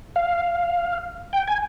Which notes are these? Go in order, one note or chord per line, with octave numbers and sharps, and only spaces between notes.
F5
G5
G#5